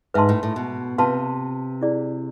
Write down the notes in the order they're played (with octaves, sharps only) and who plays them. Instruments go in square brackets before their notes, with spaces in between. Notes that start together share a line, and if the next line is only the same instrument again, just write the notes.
[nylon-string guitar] G#2 [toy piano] B4 E5 A5 C6
[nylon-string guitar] A2
A2
B2
[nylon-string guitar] C3 [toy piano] F4 B4 F5 A5 C6
[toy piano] E4 G#4 D5